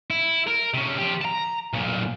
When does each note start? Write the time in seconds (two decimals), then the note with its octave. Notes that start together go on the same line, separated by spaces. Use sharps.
0.10 E4
0.47 A#4
0.74 C3 C#4
0.99 F3 G4
1.22 A5 A#5
1.73 B1 A#2